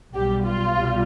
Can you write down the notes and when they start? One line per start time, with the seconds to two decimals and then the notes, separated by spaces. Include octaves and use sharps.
0.14 B1 B2 G3 G4
0.44 F4
0.73 C2 B2 G3